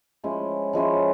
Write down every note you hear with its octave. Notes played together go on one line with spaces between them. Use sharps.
F3 G#3 C#4 E4
F3 G#3 C#4 E4